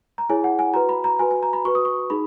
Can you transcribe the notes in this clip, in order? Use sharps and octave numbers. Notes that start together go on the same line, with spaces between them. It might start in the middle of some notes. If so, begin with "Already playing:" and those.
A#5
E4 G#4 C#5 G#5
F#5
G#5
F#4 B4 A#5
B5
A#5
F#4 B4 G#5
G#5
A#5
B5
F#4 B4 C#6
D#6
C#6
D#4 G#4 B5